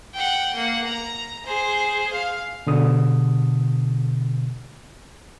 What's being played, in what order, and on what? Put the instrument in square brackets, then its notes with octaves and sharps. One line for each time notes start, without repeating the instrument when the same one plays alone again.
[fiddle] F#5 G5
A#3 F#5
A#5
G#4 C5
F5
[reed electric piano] B2 D3 D#6